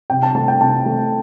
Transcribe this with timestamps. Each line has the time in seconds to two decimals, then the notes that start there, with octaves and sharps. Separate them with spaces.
0.10 C3 G5
0.23 A5
0.35 A3 A5
0.48 G5
0.61 C3 A5
0.86 A3